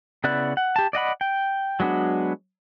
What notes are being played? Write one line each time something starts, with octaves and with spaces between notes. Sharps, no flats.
C#3 B3 E4 D5 F#6
F#5
G4 A5
D5 D#5 F#5 B5
G5
F#3 G#3 B3 D4 F#4